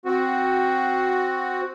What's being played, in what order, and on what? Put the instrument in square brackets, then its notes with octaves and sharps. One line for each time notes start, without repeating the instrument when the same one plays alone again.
[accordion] C4 F#4